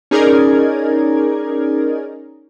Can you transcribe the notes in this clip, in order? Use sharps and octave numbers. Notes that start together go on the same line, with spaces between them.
C#4 D#4 G#4 A#4 D5 G#6